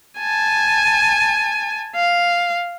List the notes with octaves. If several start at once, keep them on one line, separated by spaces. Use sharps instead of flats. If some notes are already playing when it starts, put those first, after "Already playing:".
G#5 A5
F5